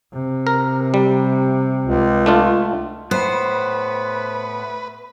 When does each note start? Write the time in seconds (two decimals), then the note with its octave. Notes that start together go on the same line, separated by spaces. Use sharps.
0.13 C3
0.47 A#4
0.94 G3
1.85 C#2
2.26 A3 D4 F4
3.11 A2 B3 B4 C5